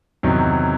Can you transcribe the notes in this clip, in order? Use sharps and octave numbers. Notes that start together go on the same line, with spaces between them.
E2 C3 D#3 F#3 D#4